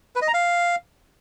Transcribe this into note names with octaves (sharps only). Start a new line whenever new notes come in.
B4
D#5
A#5
F5